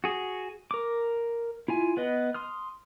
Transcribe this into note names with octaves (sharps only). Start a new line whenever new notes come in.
F#4 G#4
A#4 D6
E4 F4 G#5
B3 B4 D#5
C6 D#6 F6